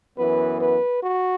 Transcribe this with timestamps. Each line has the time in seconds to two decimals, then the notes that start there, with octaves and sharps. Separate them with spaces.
0.18 F#2 E3 B3 B4
0.61 B4
1.03 F#4